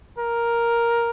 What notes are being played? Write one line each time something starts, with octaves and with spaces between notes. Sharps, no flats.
A#4